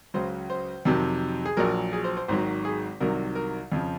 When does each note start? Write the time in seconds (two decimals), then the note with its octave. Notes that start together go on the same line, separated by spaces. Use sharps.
0.14 C#2 C#3 F#3 C5
0.50 C5
0.85 F2 C3 D#3 F#3
1.45 G#4
1.57 A#1 A#2 F#3 A#4
1.93 G#4
2.04 C5
2.17 C5
2.28 G#1 G#2 D#3 F#3 C5
2.65 G#4
3.00 C2 C3 D#3 F#3 A#4
3.35 A#4
3.72 F2 C#3 F3